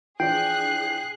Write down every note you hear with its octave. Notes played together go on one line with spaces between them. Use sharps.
E3 F3 D4 G#4 G5 F#6 C7